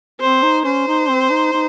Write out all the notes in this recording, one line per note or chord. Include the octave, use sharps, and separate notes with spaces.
C4 C5
D#4
C#4 C5
D#4
C4
D#4
D#4